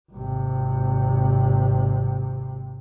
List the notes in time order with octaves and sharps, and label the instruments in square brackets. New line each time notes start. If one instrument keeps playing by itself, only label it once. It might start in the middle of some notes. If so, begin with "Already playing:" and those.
[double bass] G#1 C3